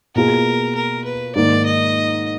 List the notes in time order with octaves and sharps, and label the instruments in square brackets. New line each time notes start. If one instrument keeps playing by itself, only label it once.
[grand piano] B2 A#3 F4 G#4 [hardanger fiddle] A#4
[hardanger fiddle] A#4
B4
[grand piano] G#2 D#3 A#3 [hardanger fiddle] D5
[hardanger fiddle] D#5